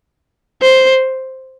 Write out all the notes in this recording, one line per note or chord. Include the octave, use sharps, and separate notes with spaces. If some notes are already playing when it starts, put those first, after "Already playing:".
C5